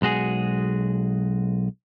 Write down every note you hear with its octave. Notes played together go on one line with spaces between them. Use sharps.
B1 G#3 F#4 G#4